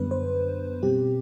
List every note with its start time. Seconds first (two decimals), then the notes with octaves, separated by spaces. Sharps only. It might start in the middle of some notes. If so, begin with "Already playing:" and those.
Already playing: F#2 D3 G3 B3 D4 B4
0.11 C5
0.82 B2 G3 C4 G4